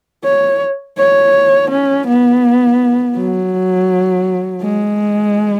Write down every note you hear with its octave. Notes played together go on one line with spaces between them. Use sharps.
C#5
C#5
C#4
B3
F#3
G#3